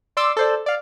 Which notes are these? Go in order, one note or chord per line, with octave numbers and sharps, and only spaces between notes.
D5 C6 D6 E6
A4 C5 D5
D5 F5